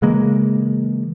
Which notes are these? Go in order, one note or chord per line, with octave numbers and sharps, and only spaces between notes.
C#3 E3 G#3 A#3